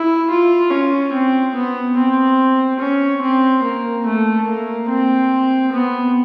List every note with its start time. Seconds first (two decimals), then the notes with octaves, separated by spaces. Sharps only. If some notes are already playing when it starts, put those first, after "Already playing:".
Already playing: E4
0.30 F4
0.71 C#4
1.12 C4
1.55 B3
1.97 C4
2.79 C#4
3.22 C4
3.63 A#3
4.06 A3
4.47 A#3
4.89 C4
5.72 B3